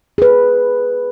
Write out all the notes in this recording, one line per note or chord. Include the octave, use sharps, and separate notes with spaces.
G#4 B4